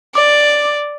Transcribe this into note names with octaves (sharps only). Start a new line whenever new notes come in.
D5 D6